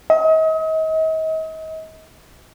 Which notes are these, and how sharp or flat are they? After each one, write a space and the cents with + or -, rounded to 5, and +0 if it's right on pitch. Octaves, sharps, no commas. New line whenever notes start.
D#5 +40